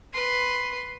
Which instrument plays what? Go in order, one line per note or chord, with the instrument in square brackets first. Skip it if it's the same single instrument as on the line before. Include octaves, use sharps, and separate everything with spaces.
[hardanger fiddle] B4 C6